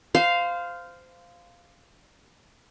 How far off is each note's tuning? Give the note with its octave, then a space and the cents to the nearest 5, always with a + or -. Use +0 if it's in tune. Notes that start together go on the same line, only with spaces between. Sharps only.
C5 -20 F5 +0